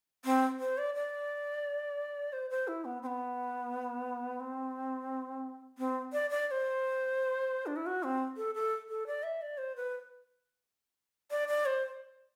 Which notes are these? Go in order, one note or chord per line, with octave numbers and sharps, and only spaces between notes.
C4
C5
D5
D5
C5
C5
E4
B3
C4
B3
C4
C4
D5
D5
D5
C5
D4
E4
F#4
C4
A4
A4
A4
D5
E5
D5
C5
B4
D5
D5
C5